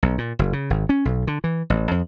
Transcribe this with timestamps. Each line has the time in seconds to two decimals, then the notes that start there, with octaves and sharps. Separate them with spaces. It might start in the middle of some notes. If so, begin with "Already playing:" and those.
0.03 B1
0.18 A#2
0.39 F#1
0.53 C#3
0.70 G#1
0.89 C#4
1.05 B1
1.27 D3
1.44 E3
1.70 A1
1.91 F2